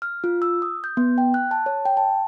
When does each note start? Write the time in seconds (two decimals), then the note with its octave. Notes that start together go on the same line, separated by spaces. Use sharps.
0.02 F6
0.24 F4
0.42 E6
0.62 D#6
0.84 G6
0.97 B3
1.18 G5
1.34 F#6
1.51 A5
1.66 C#5
1.86 G5
1.97 A5